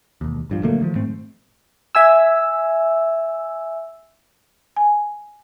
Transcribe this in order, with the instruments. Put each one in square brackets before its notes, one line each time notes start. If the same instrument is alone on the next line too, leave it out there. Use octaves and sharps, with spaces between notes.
[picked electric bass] E1 D#2
A#1 G2 F3
D3 F#3 A3 A#3
D2 D#3 F3
G#2 A3 C4
[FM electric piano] E5 G#5 E6
[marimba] G#5